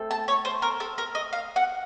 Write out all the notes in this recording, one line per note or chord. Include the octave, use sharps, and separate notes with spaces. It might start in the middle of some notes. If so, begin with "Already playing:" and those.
Already playing: A3 C4 A4
A5
C#5
C5
A#4
A4
A#4
D#5
F5
F#5